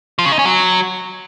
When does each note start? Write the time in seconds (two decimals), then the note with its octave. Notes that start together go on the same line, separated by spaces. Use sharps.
0.19 F3
0.25 C#3
0.32 D#4
0.39 C#4
0.46 F#3